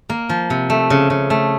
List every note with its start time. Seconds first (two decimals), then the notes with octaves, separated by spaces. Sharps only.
0.10 A#3
0.29 F3
0.50 C3
0.70 A3
0.90 C#3
1.10 C#3
1.30 A3